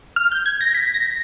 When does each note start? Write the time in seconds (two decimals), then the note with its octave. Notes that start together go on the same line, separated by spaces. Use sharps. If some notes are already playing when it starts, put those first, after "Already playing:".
0.16 F6
0.32 G6
0.46 G#6
0.61 A#6
0.74 B6
0.94 A#6